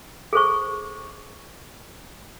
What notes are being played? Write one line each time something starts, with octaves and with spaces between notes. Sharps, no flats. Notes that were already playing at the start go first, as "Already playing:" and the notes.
G#4 A4 C5 C#6